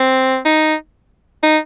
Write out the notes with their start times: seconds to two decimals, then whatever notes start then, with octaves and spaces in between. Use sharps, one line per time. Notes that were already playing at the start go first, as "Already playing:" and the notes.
Already playing: C4
0.45 D#4
1.43 D#4